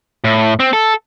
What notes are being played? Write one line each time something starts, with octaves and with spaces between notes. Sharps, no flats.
A2
C4
A4